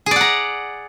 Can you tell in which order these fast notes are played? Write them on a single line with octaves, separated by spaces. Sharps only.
G#4 D5 F#5 A#5